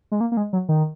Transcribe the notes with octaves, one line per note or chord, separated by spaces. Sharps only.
G#3
A#3
A#3
G#3
F#3
D#3